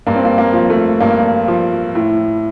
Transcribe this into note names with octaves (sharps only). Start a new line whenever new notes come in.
G2 A#3
C4
A#3
A#3
F3
A3
G2 A#3
F3
A2